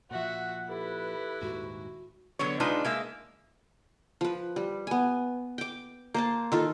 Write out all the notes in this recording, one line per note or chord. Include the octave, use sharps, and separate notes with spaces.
A#2 F3 F#4 E5 F#5
E4 G4 A4 B4
D#1 D#2 G#2 F#4
D3 F#3 B3 C#5
G#3 D4 D#4 F4 B4
G#3 A#3 E5
F3 B4
G3
B3 G#5
G5 D6
A#3 C5 A5
D#3 F4 A4